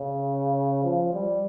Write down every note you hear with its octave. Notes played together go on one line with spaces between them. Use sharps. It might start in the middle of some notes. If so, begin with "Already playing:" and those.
Already playing: C#3
F3
G3